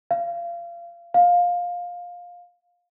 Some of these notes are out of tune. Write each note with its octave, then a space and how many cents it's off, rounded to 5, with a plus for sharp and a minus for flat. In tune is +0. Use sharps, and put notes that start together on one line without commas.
F5 -30
F5 +15